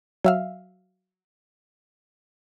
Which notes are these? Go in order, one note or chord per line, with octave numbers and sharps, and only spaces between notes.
F#3 E5 F5